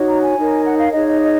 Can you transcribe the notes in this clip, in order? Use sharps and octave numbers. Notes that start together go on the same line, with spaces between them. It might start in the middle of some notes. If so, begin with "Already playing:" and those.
Already playing: D#4 F#4 C#5
A#5
G#5
D#4 A#4 C#5
F#5
F5
D#4 G#4 C#5 D#5
D#5
D#5